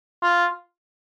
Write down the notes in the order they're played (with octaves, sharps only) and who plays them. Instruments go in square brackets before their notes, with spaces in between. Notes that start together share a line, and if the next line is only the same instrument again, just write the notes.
[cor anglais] F4